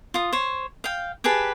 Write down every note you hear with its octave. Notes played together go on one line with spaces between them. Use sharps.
F4 D#6
C5 C#5
F5 G5
G4 G#4 B4 A5